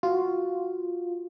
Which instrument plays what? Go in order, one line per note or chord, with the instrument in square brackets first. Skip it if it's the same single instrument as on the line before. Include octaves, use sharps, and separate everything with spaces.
[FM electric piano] F4 [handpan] F#4